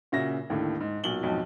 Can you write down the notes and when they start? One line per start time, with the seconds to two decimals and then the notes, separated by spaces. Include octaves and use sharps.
0.12 A#2 C#3 F#4 E5 A#6
0.50 D#2 A2 D3
0.80 G#2
1.04 B1 A#2 F#7 G7
1.23 B1 F2 G#2